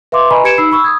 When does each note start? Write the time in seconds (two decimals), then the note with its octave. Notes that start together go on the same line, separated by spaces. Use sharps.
0.12 B4 E5 F5 C6 D6
0.31 B4 D#5 G#5 A#5 B5 C#6
0.44 G4 B4 G#6 C#7 D7 E7
0.58 D#4 B5 E6 C7
0.72 B5 C#6 E6
0.84 D#6 G#6